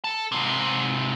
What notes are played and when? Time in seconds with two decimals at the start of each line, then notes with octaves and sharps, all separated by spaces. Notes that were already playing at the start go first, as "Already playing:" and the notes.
0.04 A4 A5
0.32 G#2 C3